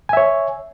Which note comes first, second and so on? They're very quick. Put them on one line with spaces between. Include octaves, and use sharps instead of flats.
G#5 E5 C#5